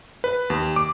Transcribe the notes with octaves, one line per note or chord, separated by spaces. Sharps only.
B4
D#2
D6